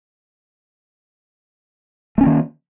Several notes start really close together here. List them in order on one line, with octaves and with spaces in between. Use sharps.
A3 C#4 A#3 D#3